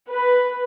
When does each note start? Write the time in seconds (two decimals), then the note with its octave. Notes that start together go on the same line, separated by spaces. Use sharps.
0.11 B4